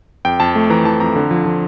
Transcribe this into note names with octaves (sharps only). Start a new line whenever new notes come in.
F2 G5
F2 A5
A3
E3 A#5
E3 A5
F2 A#5
D3
F3
F3